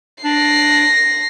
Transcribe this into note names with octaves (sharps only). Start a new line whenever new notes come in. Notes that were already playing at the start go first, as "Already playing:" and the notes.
D4 A#6 C7